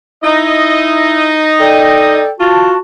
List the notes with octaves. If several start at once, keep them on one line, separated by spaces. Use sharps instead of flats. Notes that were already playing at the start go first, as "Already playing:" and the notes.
D#4 E4 D#5
A4 D5 G5
F4 F#4 A5